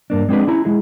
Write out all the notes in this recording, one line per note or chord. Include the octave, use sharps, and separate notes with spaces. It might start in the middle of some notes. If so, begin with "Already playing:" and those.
G2 A#3 D4
G#3 C4 D4 G4 G#4 B4
C#4 E4 A#5
G#3 E4 G#4